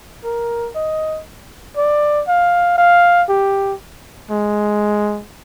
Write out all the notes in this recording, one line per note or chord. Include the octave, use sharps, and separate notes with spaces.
A#4
D#5
D5
F5
F5
G4
G#3